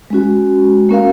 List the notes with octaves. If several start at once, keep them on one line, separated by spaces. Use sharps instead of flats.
G#3 C#4 F#4
A#3 C#4 F#4 A#4 F5